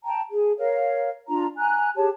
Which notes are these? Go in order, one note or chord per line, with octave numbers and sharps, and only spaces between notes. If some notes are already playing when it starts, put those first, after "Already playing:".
G5 A5 A#5
G#4
A#4 C#5 F5
D4 F4 A#5
G#5 A#5 F#6
G4 G#4 C#5 A5